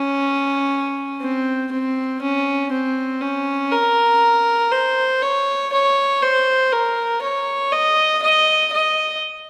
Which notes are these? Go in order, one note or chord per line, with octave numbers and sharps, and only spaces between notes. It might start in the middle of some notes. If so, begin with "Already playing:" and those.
Already playing: C#4
C4
C4
C#4
C4
C#4
A#4
C5
C#5
C#5
C5
A#4
C#5
D#5
D#5
D#5